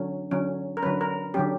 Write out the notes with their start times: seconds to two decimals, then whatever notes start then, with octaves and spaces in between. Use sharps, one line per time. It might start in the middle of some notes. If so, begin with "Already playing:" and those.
Already playing: D3 F#3 C#4
0.31 D3 F#3 C#4
0.77 A#4
0.82 C#4 B4
0.85 D3 F#3
1.01 A#4
1.34 D3 F#3 C#4 G4